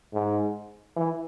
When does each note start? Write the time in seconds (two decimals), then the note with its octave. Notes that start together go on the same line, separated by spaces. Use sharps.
0.13 G#2
0.96 E3